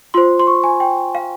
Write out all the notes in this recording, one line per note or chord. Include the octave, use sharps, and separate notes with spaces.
F4 C5 C6
C6
C#6
G#5
G5
F5